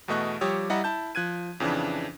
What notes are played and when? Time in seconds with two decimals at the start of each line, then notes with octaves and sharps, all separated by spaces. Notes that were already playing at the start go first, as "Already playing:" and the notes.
0.08 E2 B2 A3 D#5 C#6 F#6
0.41 F3 G3 G4 C#5 D#6 E6
0.70 G3 E4 D#5 F#5 A#5
0.84 E4 A5 G6
1.15 F3 F#6 G#6 D#7
1.60 F2 C#3 E3 D4